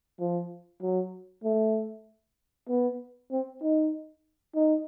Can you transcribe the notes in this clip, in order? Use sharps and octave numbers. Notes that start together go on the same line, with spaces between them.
F3
F#3
A3
B3
C4
D#4
D#4